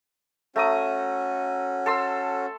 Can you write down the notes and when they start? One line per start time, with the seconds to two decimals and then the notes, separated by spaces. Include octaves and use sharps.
0.56 A3 C#4 F#4 A#5 D#6
1.86 A4 C6 E6